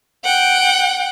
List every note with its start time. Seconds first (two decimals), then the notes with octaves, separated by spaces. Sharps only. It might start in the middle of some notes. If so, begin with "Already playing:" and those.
0.25 F#5 G5